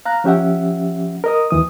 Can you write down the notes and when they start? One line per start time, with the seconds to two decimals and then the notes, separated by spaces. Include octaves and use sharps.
0.05 F5 A#5 F#6
0.24 F3 C#4 G4 E5 F#5
1.24 A#4 D#5 D#6
1.50 D#2 E3 D#6